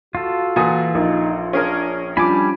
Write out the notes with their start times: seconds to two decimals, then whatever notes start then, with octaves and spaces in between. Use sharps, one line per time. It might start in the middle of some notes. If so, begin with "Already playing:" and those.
0.15 F4 F#4 A4
0.56 A#2 E3 F#4 G#5 D#6
0.95 A#1 D#4
1.53 C#4 D4 G#4 A#4
2.17 F3 G3 C#4 D4 G#5 B5 D6